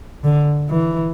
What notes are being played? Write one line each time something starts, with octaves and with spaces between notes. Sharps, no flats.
D3
E3